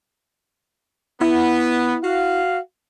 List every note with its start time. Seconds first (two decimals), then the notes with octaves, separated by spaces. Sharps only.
1.21 B3 E4
2.03 F#4 F5